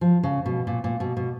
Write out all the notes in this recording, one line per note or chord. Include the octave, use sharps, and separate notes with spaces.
F3
C#3
B2
A#2
A#2
B2
B2